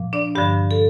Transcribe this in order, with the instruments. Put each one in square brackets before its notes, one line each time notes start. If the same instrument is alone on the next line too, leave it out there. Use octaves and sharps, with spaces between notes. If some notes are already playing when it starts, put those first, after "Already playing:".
Already playing: [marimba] A#2 F3
D4 D5
G2 D3 F3 G4
A4